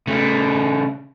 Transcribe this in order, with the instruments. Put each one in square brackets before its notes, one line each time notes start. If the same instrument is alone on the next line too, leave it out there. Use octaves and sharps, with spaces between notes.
[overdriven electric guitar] C#3 A3